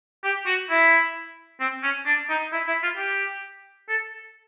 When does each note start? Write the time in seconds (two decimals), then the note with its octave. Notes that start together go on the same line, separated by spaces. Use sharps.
0.24 G4
0.46 F#4
0.70 E4
1.60 C4
1.83 C#4
2.06 D4
2.29 D#4
2.52 E4
2.67 E4
2.83 F4
2.97 G4
3.89 A4